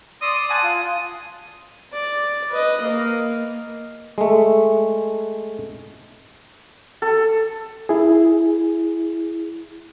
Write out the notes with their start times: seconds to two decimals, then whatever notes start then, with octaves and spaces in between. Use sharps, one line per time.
0.22 D5 C6 D#6 E6
0.50 F#5 G#5 A5 D#6
0.63 F4
1.92 D5
2.50 B4 D#5
2.81 A#3
4.18 G#3 A3
7.02 A4
7.89 E4 G#4